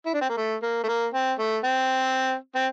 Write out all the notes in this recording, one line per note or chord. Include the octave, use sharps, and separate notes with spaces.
E4
D4
C4
A#3
A3
A#3
A3
A#3
C4
A3
C4
C4